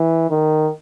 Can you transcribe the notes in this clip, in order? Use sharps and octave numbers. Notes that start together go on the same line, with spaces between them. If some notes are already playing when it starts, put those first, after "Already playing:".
Already playing: E3
D#3